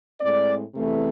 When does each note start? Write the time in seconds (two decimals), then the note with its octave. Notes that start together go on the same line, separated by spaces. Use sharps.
0.21 A2 G#3 C4 D5
0.75 E2 C3 E3 A3 C4